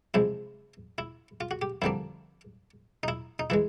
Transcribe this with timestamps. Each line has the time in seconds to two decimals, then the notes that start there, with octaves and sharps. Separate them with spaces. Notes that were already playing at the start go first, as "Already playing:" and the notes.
0.14 C3 F3 G#3 E4
0.98 E4
1.41 F4
1.51 F#4
1.62 G4
1.82 F2 D3 G3 A#3 D4 E4
3.03 D#4
3.08 E4
3.39 D#4
3.50 E3 G#3 E4